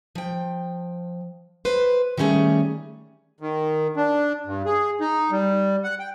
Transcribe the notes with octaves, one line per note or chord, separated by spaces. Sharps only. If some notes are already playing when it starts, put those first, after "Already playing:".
F3 G5
B4 C5
D#3 G3 A3 C#4 G#4
D#3
D4
G2
G#4
D#4
G3
F#5
G5